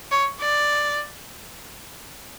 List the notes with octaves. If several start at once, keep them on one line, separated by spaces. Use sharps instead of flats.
C#5
D5